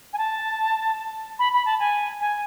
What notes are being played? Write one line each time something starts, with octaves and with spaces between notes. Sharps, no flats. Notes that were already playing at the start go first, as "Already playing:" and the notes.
G#5
A5
B5
B5
A5
G#5
G#5